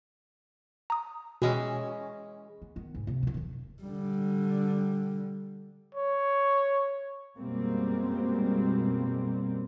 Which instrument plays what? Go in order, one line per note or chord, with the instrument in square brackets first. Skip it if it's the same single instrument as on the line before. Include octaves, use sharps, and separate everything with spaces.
[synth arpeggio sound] A#5 D#6
[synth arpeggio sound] B2 [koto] E3 G#3 C#4
[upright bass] B3
D#3 B3
G#2 C3
C3 B3
B1 B2
E1 D#3
[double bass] D3 G3
[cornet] C#5
[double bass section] F#2 B2 G3 G#3 A#3 C4